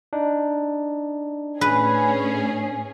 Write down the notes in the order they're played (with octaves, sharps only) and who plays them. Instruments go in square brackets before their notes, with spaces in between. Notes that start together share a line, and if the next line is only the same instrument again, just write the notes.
[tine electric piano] D4 D#4
[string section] A2 C#4 G#4 [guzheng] B4